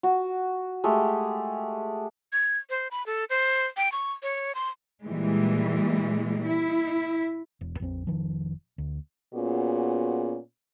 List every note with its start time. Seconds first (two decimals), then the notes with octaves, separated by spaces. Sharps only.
0.03 F#4
0.84 G#3 A3 G4
2.33 G#6
2.70 C5
2.91 B5
3.06 A4
3.30 C5
3.77 G5
3.92 C#6
4.23 C#5
4.55 C6
5.04 A#2 E3 G3 G#3
6.46 E4
7.61 E1
7.80 A#1 F2 F3 C4
8.07 F1 D#3 F3
8.78 D2
9.34 A#2 B3 C#4 F4 F#4 G#4